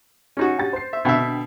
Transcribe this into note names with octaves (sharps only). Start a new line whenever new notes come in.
C#4 D#4 F#4
G4 G5 A6
C5 C7
E5
B2 D3 C4 E5 G5